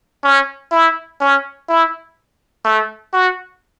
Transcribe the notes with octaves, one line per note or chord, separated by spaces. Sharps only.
C#4
E4
C#4
E4
A3
F#4